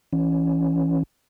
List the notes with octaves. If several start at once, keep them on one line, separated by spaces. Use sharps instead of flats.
E3 C#4